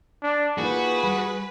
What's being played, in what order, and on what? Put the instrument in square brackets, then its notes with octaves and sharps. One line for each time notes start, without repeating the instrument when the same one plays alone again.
[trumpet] D4
[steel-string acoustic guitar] A#3 D#4 F4 [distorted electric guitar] F#4 [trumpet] G#4 [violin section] B4
[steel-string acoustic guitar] G3